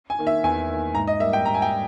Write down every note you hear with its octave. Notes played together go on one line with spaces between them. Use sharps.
G#5
D#3 A#3
E5
E2 G#5
D#3 A#3
G#2 A#5
D#5
G3 A#3 E5
G5
G#2 A#5
G#5
G5
G3